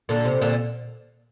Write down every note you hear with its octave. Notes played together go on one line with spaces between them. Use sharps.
A#2 D3
C3
A#2 D3